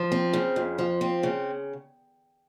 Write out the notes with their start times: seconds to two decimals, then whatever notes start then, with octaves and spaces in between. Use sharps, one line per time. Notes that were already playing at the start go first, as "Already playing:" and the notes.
Already playing: F3
0.12 C4
0.33 C#3
0.56 F2
0.78 F3
1.01 C4
1.23 C#3